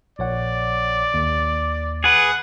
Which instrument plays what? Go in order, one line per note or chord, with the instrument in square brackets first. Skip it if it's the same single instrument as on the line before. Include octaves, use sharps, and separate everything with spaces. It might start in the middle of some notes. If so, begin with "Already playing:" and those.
[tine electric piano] A#1 C#5 F#5 [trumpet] D5
[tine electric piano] D#2
[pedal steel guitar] G#4 B4 [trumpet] F#5